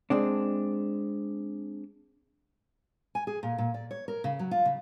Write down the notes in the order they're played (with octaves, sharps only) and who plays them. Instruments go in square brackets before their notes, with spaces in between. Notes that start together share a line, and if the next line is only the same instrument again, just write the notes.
[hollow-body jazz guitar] G#3 C4 D4
[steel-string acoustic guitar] G#5
G#4
A#2
A#2
D5
C#5
A#4
C#3
F#3
F4
C#3